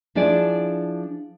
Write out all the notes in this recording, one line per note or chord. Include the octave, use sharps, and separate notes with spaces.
F3 D4 E4 G#4 D5